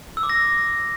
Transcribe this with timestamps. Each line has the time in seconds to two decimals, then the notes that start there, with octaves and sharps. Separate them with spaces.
0.17 E6
0.23 D6
0.29 A#6